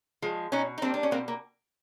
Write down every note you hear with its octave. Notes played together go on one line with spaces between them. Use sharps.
F3 G#3
B2 C#4 D#4
D#4
G3 A#3 C4 D4
D4
C#4
B2 A#3 C4
A#3